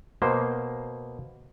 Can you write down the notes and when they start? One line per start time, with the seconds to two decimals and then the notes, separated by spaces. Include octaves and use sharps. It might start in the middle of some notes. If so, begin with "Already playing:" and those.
0.22 B2 A#3 C5